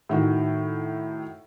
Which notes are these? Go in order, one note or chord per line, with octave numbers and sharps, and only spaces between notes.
A2 D#3 F#4